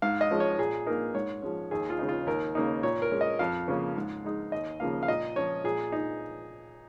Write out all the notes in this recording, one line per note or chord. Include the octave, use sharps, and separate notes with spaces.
G#2 F5
D#5
F3 G#3 C#4
C#5
A#2 G#4
A#3 D#4 A#4
G#2 C#5
F3 G#3 C#4
D#2 G#4
F4
C#3 G#3 D#4
F4
D#2 A#4
C#3 A#3 D#4
A#2 C#5
A#4
G#3 C#4
D#5
F2 F5
C#3 F3 A#3 C#4
G#2
G#3 D#4
D#2 D#5
C#3 F3 A#3 F5
F5
A#2 D#5
F3 C#4 C#5
A#2 G#4
D#4